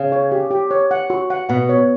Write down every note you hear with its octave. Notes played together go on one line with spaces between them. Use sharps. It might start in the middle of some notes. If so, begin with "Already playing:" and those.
Already playing: C#3
C#5
G4
G4
C#5
F#5
F#4
F#5
B2 F#5
C#5